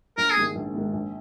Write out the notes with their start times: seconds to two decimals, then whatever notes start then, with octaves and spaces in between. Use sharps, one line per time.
0.18 A#1 A#4
0.30 G#4
0.37 G#2 D#3 G#3
0.55 A#1
0.74 G#2 D#3 G#3
0.93 A#1